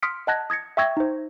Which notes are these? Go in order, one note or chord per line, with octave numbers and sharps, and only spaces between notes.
C6 D#6 F6 B6 C#7 D7
D#5 F#5 A5 F#6 G#6 A#6
D#6 G#6 A#6 C#7
E5 G5 C#6 E6 G#6 A#6
D#4 C5